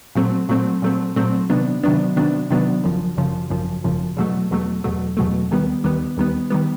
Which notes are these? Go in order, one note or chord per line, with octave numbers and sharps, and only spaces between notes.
A#2 F#3 A3 C4
A#2 F#3 A3 C4
A#2 F#3 A3 C4
A#2 F#3 A3 C4
C3 D#3 F#3 B3 D4
C3 D#3 F#3 B3 D4
C3 D#3 F#3 B3 D4
C3 D#3 F#3 B3 D4
G#1 F#2 C#3 F3
G#1 F#2 C#3 F3
G#1 F#2 C#3 F3
G#1 F#2 C#3 F3
E2 B2 F#3 A3
E2 B2 F#3 A3
E2 B2 F#3 A3
E2 B2 F#3 A3
D#2 D#3 G3 B3
D#2 D#3 G3 B3
D#2 D#3 G3 B3
D#3 G3 B3